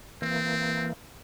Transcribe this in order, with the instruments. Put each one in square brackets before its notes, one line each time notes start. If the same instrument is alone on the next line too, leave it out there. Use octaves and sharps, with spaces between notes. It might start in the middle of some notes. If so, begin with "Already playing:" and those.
[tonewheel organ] E3 A#3 [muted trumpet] C4